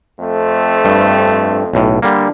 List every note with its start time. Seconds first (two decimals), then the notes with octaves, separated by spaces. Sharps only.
0.20 F2 A3 C4
0.85 G2
1.73 B1 A2
2.02 D3 G3 A#3